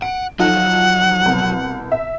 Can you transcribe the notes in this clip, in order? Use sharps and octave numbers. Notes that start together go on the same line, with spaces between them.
F#5 D7
F3 F#3 D#4 F4 A4 F#5
C2 B2
E5